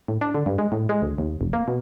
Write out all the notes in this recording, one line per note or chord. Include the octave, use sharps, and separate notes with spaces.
A2
D4
D3
G2
G#3
A2
G#3
D2
D#2
F1
A#3
B2